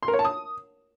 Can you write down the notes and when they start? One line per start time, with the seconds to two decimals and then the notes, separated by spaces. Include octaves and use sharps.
0.03 C6
0.08 A#4
0.14 C#5
0.19 A5
0.25 D#6